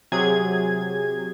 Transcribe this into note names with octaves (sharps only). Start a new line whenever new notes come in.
C3 F#3 G#4 G#6